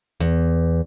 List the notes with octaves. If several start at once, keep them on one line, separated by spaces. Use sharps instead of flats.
E2